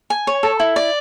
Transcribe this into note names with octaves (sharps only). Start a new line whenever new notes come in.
G#5
C#5
A4
E4
D5